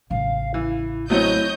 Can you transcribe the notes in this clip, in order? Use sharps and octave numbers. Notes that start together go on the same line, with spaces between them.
A1 C#3 F5
E3 E4
F#3 A3 C4 E4 C#5 D#5 G6